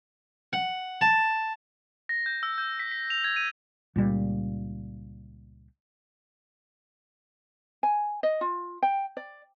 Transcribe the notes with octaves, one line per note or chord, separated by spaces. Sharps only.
F#5
A5
A#6
G6
E6
G6
B6
B6
F7
G#6
D#7
C#2 A#2 G3
G#5
D#5
F4
G5
D5